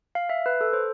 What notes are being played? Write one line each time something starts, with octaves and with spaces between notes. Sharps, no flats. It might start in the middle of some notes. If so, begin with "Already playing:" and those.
F5
E5
B4
A4
C5